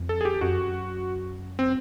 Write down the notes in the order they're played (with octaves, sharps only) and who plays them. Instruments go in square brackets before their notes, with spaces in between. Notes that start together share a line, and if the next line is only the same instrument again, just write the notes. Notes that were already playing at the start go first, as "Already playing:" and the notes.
Already playing: [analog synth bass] F2
[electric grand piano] A4
G#4
G4
[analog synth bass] F#2 [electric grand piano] F#4
[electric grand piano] C4